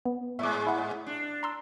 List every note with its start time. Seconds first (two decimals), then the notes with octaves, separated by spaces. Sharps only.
0.05 B3
0.39 G#2 G#3 E5 D6
0.67 E4 F#5
1.07 D4
1.43 A#5 C6 E6